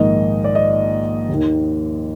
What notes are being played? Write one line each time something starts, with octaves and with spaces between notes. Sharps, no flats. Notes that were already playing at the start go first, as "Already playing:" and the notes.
Already playing: A#1 G#2 D#3 D#5
D5
D#5
D#2
D#3